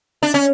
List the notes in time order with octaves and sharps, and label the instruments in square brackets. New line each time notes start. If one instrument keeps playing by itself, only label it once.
[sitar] D4
C#4